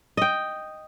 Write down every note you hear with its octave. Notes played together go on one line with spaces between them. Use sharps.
D#5 G5